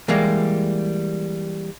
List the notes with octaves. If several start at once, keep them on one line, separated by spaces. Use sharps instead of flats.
E3 G3 G#3 A#3